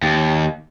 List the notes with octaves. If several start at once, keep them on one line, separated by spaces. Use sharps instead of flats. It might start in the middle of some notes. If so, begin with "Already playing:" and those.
D#2